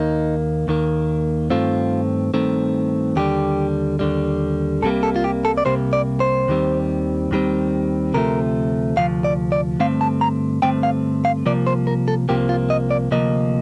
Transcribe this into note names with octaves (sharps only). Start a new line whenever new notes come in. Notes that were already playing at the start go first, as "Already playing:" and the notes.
Already playing: D#2 D#3 A#3 D#4
D#2 D#3 A#3
G2 D#3 A3 C4 F4
G2 D#3 A3 C4
D#2 D3 G3 G4
D#2 D3 G3
C2 C3 G3 A#3 A4
A4
F4
G4
A4
D5
C2 C3 G3 A#3 C5
D5
C5
D#2 D#3 G3 C4
D#2 D#3 G3 C4
D2 C3 F3 A3 A#4
D2 C3 F3 F5
D5
D5
G2 D3 A3 C4 F5
A5
A#5
G2 D3 A3 C4 G5
F5
F5
C2 C3 F3 A#3 D5
C5
A#4
A4
C2 C3 F3 A#3 G4
F4
D#5
D5
D2 C3 F3 A#3 D#5